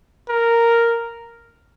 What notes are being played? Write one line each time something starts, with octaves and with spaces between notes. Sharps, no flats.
A#4